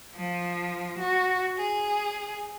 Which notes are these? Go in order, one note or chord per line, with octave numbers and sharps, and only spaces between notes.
F3
F#4
G#4